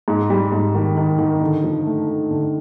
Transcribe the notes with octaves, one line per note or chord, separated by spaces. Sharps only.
G#2
G3
G#2
D#3
D#3
D#3
D3
F3
A3
A3
D3